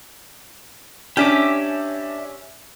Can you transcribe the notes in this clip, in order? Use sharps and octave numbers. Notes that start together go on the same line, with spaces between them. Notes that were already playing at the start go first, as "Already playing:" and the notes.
C#4 D4 G4 E5 D6